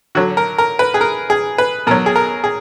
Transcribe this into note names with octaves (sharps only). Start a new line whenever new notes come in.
D3 F#3 F#4
A#4
A#4
B4
G#4
A#4
G#4
B4
B2 F#3 A#4
G#4
A#4
G#4